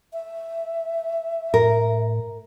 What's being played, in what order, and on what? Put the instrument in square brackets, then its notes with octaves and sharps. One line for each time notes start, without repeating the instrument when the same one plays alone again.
[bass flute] E5
[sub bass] A2 [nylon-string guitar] A#4